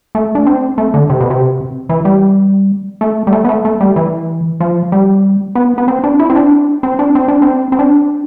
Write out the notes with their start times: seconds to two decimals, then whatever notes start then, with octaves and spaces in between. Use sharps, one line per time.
0.15 A3
0.35 D4
0.47 C4
0.78 A3
0.94 D3
1.10 C3
1.21 B2
1.30 C3
1.89 E3
2.05 G3
3.01 A3
3.27 G3
3.33 A3
3.45 B3
3.49 A3
3.65 A3
3.81 G3
3.96 E3
4.60 F3
4.92 G3
5.55 B3
5.78 B3
5.88 C4
6.04 D4
6.19 E4
6.30 C4
6.35 D4
6.83 C4
6.99 D4
7.15 C4
7.28 D4
7.42 C4
7.72 C4
7.79 D4